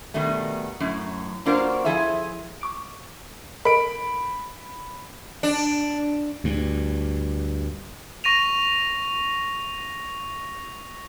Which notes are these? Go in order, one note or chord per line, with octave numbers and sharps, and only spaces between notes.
B2 D#3 G3 A3
F#2 A2
A#3 D4 F4 F#4 A#4 C5
F3 E4 G#4 A4 E5
C#6 D6 D7
A4 A#4 D#5 B5 D7
D4
D2 G2
C#6 A#6 D#7 F7